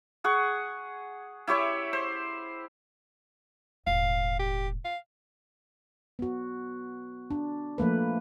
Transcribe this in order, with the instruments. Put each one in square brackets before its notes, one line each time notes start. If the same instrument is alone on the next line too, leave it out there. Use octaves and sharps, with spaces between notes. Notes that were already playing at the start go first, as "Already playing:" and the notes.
[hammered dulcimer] G#4 F#5 C#6
E4 G4 C#5 E5
C5
[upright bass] E1 A1 [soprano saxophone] F5
[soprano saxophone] G4
F5
[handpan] B3 F#4
D4
F3 A3 A#3 B4